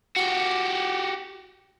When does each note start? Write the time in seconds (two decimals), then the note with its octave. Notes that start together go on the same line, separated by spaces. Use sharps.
0.17 F#4 G4